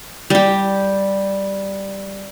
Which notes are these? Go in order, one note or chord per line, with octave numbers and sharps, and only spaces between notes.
G3 G4